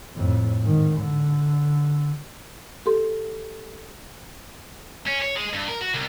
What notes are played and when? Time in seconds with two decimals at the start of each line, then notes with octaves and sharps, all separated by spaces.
0.16 F2 A2
0.62 G#2 D#3
0.99 D3
2.86 G4 A4 C6
5.07 C#4
5.22 C#5
5.35 G#3
5.53 G2
5.68 A#4
5.81 F#4
5.93 C2